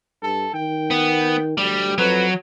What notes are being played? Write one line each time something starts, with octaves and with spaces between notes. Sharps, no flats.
G2 A4
D#3 G5
B3
D2 G3
F2 F#3 B4